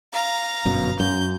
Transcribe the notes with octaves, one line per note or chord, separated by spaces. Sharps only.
F5 A#5
G1 F#2 B2
F#2 G6